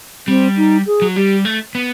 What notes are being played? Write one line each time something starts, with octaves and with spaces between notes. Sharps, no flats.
G3 C4
D#4
G#4
F#3
G3 G4
A3
B3